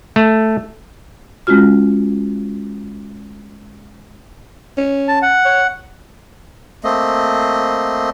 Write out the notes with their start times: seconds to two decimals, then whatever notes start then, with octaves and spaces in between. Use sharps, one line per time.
0.16 A3
1.47 G#3 C#4 F4 F#4 F6
4.77 C#4
5.08 A5
5.22 F#5
5.45 C#5
6.84 A3 A#3 C4 D#5